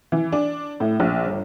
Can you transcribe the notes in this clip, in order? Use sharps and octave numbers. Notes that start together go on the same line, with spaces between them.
E3
D4
A2
A#1
G1